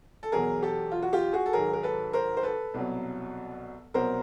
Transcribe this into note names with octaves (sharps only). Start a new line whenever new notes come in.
A4
E2 B2 F#3 G#4 A#4
G4 A4
F4
F#4
F4 G4
F#4 G#4
A4
G#2 D#3 F#3 G#4 A#4
A#4
A4 B4
A#4 C5
C5
A4 B4
C2 B2 F#3
C2 B2 F#3 A#4 C5